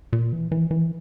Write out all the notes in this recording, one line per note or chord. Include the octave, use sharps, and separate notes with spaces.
A#2
E3
E3
E3